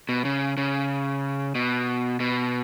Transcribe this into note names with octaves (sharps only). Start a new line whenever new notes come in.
B2
C#3
C#3
B2
B2